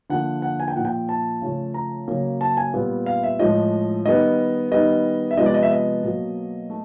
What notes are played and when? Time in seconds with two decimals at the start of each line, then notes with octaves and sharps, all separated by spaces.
0.10 D3 F3 A#3 F#5
0.42 F#5
0.60 G#5
0.68 G5
0.76 A#2 F3 A#3 F#5
0.85 G5
1.09 A5
1.42 C#3 F3 A3
1.74 A#5
2.08 C#3 F#3 A#3
2.41 A5
2.57 G#5
2.73 A#2 G3 B3
3.06 F5
3.23 E5
3.39 A2 F3 G#3 D#5
4.05 D#3 G3 B3 D#5
4.72 D#3 G3 B3 D#5
5.31 E5
5.37 C3 F3 G#3 B3 D#5
5.46 D5
5.54 D#5
5.63 E5
5.71 D#5
6.03 B2 F#3 A#3
6.70 A3